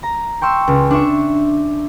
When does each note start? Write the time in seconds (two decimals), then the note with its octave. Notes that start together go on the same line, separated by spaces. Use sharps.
0.03 A#5
0.42 G5 C6 C#6 E6
0.68 C#2
0.91 D4 E5 C#6